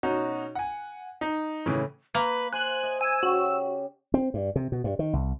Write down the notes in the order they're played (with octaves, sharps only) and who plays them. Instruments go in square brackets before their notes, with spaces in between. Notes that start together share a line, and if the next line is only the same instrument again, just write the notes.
[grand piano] B2 C#4 D#4 F#4
F#5 G#5
D#4
A2 C#3 E3
[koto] A#3 [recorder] B4
[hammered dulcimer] C5 [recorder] G#5 [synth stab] F#6
[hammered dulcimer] D#5 E5
[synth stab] G#5 [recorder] E6
[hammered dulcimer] C#3 G4 [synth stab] F#4
[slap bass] C4
G2
C3
B2
G2
D#3
C2